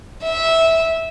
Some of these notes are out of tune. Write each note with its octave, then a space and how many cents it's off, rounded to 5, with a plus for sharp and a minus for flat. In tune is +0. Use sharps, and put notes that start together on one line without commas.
E5 -15